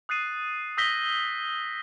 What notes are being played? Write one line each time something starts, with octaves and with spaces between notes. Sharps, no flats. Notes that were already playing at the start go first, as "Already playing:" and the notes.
D#6 F#6 A6 C7 D#7
D#6 E6 G6 A#6 B6 G7